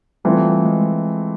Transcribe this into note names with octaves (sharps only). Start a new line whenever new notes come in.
E3 G3 A3 C4 F4
G#3